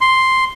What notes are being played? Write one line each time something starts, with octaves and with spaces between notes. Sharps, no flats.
C6